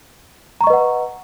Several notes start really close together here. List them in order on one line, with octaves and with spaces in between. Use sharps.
A#5 C#6 D#5 B4 F#5